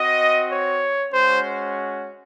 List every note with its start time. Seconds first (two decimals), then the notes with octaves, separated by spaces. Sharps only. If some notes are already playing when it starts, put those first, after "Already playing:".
Already playing: C4 F#4 D#5
0.49 C#5
1.12 G#3 C#4 F#4 C5